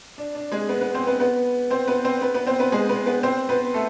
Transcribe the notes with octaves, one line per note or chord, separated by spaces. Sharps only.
D4
D4
G#3 G#4
B3 B4
B3 B4
C4 C5
B3 B4
B3 B4
C4 C5
B3 B4
C4 C5
B3 B4
B3 B4
C4 C5
B3 B4
G#3 G#4
B3 B4
B3 B4
C4 C5
B3 B4
A3 A4